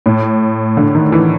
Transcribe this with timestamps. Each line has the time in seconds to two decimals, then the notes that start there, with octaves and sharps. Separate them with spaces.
0.06 A2
0.77 D3
0.95 D#3
1.12 E3